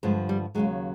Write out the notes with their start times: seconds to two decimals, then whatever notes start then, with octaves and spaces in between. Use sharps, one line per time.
0.03 G2 D3 F3 G#3
0.29 G3
0.55 D#2 C#3 F#3 G#3